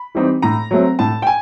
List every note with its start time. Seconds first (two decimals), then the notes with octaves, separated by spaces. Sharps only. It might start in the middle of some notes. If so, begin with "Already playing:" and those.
Already playing: B5
0.15 E3 G3 C4 D#4
0.42 A2 A#5
0.71 F#3 A3 C4
0.99 A2 A5
1.22 G5
1.27 G#5